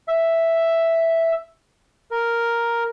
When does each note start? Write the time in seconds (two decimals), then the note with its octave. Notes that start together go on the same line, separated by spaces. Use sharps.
0.08 E5
2.11 A#4